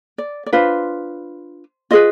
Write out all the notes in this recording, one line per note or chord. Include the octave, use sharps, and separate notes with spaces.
D5
D5
D4 F4 B4 C5
F4 G#4 B4 D#5